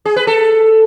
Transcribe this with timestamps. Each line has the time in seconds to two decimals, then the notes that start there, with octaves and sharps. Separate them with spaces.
0.05 G#4
0.16 B4
0.27 A4